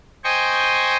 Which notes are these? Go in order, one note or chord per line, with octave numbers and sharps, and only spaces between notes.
C5 D#5 G5 G#5 C#6